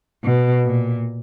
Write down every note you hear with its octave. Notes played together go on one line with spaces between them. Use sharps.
B2
A#2